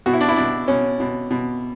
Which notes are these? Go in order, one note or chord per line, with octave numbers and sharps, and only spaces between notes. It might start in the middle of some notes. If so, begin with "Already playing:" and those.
B2 F#4
E4
D4
E4
B2 D4
B2 C#4
B2
B2